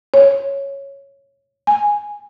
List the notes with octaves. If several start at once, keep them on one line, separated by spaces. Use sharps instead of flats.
C#5
G#5